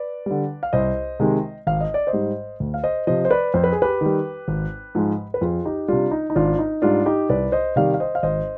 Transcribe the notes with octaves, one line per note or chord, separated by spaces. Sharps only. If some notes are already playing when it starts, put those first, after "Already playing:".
Already playing: B4 D5
D3 G3
F5
C2 C5 D#5
C3 D#3 G#3
G#1 F5
D#5
D5
C5 D#5
G#2 G3
D2
F5
C5 D#5
C3 F3 C5 D#5
C5
B4 D5
F2 C5
B4
G#4
G4 B4
D#3 G3
G#1
G#2 F3 G#3
B4
F2 F4 G#4
D#4 G4
C3 G3 D4 F4
D#4
D#4
G#1 D4 F4
D#4
G#2 G3 D4 F4
D#4 G4
C2 B4 D5
C5 D#5
C3 D#3 G3 D5 F5
F5
C5 D#5
F5
G#1 C5 D#5